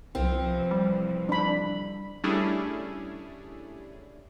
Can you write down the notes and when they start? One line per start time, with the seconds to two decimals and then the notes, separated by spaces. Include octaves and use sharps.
0.15 C2 C3 E3 F3 C4 F4
0.71 G3
1.29 D4 B5
2.24 G3 A3 C#4 D4 E4 G#4